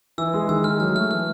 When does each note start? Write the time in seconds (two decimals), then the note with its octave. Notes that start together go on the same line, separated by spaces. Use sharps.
0.18 E3 E6
0.34 G#3
0.49 D#3 E6
0.64 G#3 F6
0.80 F#3 F6
0.95 A3 F6
1.10 E3 F6